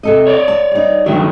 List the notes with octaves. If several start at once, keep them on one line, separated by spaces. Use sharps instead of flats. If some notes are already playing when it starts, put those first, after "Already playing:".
C3 A4 D#5
C#5 D5
A5
G3 D#4
G2 D#3 F#3 E5